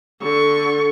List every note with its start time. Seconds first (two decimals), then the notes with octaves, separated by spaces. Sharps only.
0.21 D3 C#6